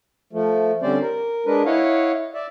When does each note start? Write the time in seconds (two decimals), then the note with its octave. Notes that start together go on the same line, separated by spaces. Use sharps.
0.33 F3 A3
0.82 D3 G3 C4 C#4 C5 D5
1.02 A#4
1.46 G#3 D4 A#4 B4
1.66 E4 C#5 D#5 F5 F#5
2.34 D5 E5